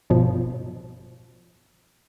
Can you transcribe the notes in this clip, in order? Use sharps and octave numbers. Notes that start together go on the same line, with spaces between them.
G1 B2 F3